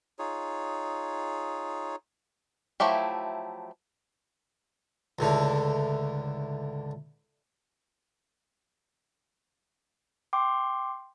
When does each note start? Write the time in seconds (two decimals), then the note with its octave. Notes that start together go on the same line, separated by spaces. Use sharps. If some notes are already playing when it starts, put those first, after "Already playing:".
0.19 D#4 F4 G#4 C#5
2.80 F3 F#3 A3 E4 G4
5.19 C#2 A2 D3
10.33 G5 C6 D6